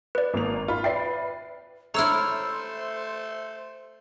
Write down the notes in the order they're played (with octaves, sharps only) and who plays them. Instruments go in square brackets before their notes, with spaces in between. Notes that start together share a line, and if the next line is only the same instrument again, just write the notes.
[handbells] B4 D5
[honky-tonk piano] G#1 A#3 F7
F4 B5
[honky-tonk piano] B4 A6 C7 [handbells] D5 E5 G5
[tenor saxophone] A3 [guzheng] E4 C#5 [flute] C5 [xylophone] A#5 E6 F6